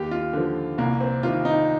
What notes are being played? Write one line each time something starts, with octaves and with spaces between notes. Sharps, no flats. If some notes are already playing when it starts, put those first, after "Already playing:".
Already playing: D#2 G4
F4
D3 F3
C2 A#3
C4
C3 D#3 F4
D#4